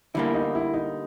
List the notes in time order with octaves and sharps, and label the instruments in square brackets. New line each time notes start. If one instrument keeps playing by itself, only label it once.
[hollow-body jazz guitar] D3 G3 A#3 [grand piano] E4
[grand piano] D#4
E4
D#4